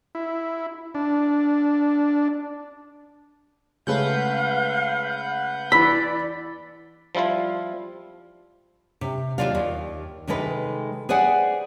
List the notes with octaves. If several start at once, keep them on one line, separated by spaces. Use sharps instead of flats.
E4
D4
C#3 G#3 A3 B4 F5 F#5 G6
E3 D5 B5 E6
F3 G3 E4 F4 F5
C3
D#2 F#3 F4 D5 F5
D#2
C3 D#3 G#3 A4 B4
G#4 B4 C5 D5 F#5 G#5